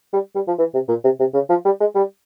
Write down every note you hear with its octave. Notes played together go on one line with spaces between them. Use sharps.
G3
G3
F3
E3
C3
A#2
C3
C3
C#3
F3
G3
G#3
G3